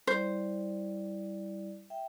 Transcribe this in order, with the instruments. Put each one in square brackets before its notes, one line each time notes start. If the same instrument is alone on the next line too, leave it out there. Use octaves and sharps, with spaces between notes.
[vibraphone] G3 E4 D5 [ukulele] C5
[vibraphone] E5 G5